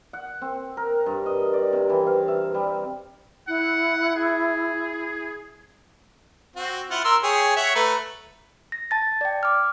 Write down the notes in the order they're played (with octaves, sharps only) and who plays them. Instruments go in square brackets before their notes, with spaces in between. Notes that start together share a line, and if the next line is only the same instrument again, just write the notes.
[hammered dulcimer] F#5
C4
A#4
G2
D#5
D5
C3
E3
F5
E5
G3
[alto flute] E4 [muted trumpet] F#5
[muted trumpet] G#4
[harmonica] C4 F#4
E4 F4 F#5
A#4 C6 E6
G4 G#4 C#5
C#5 E5 F#5
A3 B4 A#5
[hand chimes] A#6
A5 A6
D5 G5
D6 F6